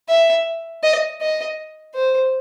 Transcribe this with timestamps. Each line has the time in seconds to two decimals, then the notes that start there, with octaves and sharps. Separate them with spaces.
0.09 E5
0.83 D#5
1.21 D#5
1.95 C5